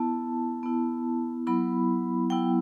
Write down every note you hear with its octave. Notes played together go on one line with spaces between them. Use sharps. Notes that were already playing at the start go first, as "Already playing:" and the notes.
Already playing: B3 E4 A5
B3 E4
F#3 B3 E4 B5
F#3 B3 E4 G5